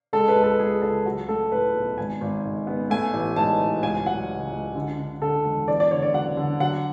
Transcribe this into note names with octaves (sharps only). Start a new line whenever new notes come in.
G#3 A4
B4
C#2
A4
C#2 G#4
C#2 A4
F#3 F#4
A3 A4
A2 B4
B1
G#1 G#5
G#1
G#2
B3
A3 G#5
A1
G#2 A5
A1
C#2 G#5
F#3 F#5
C#3
C#2
D3
D3
D3 A4
E1
E2 D5
D5
D3 C#5
D5
F#3 F#5
D3
F#3 F#5